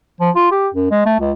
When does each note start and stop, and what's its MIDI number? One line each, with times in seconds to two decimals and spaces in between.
0.20 0.30 53
0.36 0.51 65
0.51 0.68 67
0.74 0.91 42
0.91 1.02 56
1.06 1.17 57
1.20 1.32 37